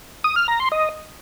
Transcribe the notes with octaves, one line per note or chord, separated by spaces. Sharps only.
D#6
F6
A#5
C6
D#5